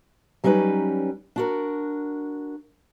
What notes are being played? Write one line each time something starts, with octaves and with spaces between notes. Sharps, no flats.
F#3 G3 C#4 D#4 B4
D4 F#4 A#4